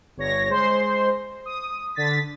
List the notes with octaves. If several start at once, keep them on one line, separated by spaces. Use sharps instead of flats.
G1 C#5 A#6
G#3 C5 C6
D#6
D3 A6 B6